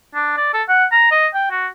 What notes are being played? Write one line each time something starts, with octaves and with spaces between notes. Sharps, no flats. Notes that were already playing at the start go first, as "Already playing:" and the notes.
D4
D5
A4
F#5
A#5
D#5
G5
F#4